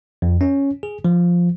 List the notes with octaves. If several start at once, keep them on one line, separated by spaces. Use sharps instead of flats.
F2
C#4
G#4
F3